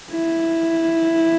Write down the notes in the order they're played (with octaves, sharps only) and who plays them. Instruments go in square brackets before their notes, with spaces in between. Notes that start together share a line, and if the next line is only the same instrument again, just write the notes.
[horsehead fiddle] E4